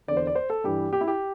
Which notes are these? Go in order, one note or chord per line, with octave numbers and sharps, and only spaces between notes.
E2 D3 D5
C5
D5
C5
A4
G2 E3 G4
G4
E4
G4